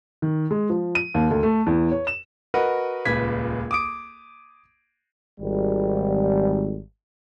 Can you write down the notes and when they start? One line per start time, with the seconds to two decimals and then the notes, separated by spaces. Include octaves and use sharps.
0.22 D#3
0.51 G#3
0.70 F3
0.95 D#7
1.14 D#2
1.31 D2
1.43 A3
1.66 E2
1.92 C#5
2.07 E7
2.54 F#4 A#4 B4 D#5 F#5
3.05 D#1 C#2 B4 G#6 B6
3.71 D6 D#6 D7
5.40 G#1 G3